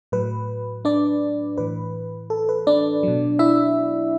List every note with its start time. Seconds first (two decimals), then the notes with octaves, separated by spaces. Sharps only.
0.12 A2 F#3 B4
0.85 D4 D5
1.57 A2 E3 B4
2.30 A4
2.49 B4
2.67 D4 D5
3.03 B2 F#3
3.39 E4 E5